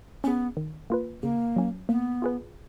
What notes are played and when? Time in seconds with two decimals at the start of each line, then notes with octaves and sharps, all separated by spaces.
0.24 B3 C#4 G#4
0.57 D#3
0.90 A#3 F4 B4
1.22 C#3 A#3
1.56 F#3 C#4
1.89 A#3 B3
2.22 F4 G#4 B4